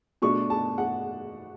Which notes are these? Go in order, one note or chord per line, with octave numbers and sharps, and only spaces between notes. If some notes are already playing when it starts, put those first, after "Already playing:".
B2 A3 D4 C#6
A5
F#5